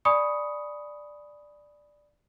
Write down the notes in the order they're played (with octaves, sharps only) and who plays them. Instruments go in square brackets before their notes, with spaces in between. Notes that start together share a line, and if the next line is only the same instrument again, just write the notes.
[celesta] D5 G#5 B5 C#6 D#6 C#7